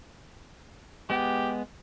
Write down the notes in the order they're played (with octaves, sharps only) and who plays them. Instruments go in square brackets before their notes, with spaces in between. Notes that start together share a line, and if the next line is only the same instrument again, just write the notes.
[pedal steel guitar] G#3 B3 [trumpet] G4